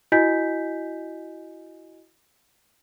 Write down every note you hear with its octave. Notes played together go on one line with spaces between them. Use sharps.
E4 F#4 D#5 G#5 G6 B6